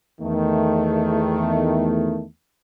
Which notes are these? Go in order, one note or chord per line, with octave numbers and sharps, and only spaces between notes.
E2 D#3 A3